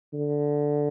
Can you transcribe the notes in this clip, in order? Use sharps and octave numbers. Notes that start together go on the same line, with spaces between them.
D3